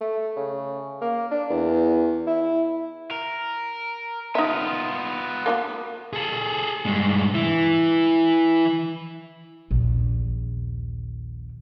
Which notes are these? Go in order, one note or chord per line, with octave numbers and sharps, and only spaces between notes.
A3
C#3
A#3
D4
E2
E4
A#4
B3 D#4 F4 E5
A#3 D#4 F#4
G#4 A4
G2 G#3
E3 E4
A#1 D#2